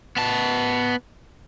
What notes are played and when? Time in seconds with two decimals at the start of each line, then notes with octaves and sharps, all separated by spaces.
0.17 B3 A5